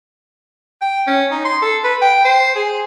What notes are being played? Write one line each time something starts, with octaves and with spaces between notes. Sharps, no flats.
G5
C#4
D#4
C6
A4
B4
G5
C5
G#4